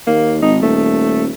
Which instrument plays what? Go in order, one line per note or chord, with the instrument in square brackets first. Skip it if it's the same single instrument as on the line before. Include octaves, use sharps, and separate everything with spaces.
[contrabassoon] D#2 [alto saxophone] A#3
[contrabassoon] G#1 [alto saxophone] D#4
[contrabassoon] D#1 [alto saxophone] A3